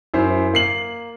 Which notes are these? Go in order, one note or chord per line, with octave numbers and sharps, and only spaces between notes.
F#2 E4 C5
A#3 C7 F#7